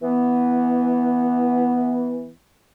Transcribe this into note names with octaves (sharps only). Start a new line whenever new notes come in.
E3 B3